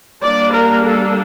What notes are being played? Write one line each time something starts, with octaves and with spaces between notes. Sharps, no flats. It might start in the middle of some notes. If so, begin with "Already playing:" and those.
G3 A#3 D4 D5
A#4
A4